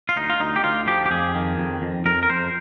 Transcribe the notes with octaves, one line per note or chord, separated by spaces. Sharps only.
F4
D2 D#4
F4
D2 D#4
G4
D2 F4
F3 G4
G4
F2 G#4
D#3
F2
F2
F2 A#4
A#4
F2 C5